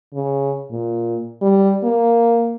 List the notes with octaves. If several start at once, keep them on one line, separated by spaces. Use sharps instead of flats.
C#3
A#2
G3
A#3